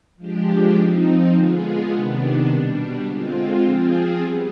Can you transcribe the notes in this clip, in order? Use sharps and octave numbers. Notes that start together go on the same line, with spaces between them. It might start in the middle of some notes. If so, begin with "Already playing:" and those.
F3 G#3 D4 G4
F3 C4 D#4
D3 G#3 B3 F4 G#4
C3 D#3 B3 D4
B2 G3 D4
D3 G#3 C4 F4
F3 C4 F4 G#4
G3 B3